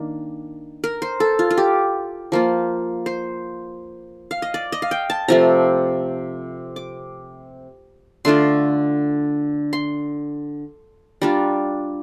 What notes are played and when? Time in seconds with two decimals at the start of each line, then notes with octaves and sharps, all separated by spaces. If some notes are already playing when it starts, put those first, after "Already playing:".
Already playing: D#3 A#3 D4
0.84 A#4
1.02 C5
1.20 A4
1.39 F4
1.51 F4
1.58 G4
2.32 F3 A#3 F4
3.06 C5
4.31 F5
4.42 D#5
4.54 D5
4.72 D#5
4.82 F5
4.91 G5
5.10 A5
5.28 C3 F3 A3 A#5
6.76 D6
8.25 D3 A3 D4 F4 C6
9.73 C6
11.22 G3 D4 F4 A#5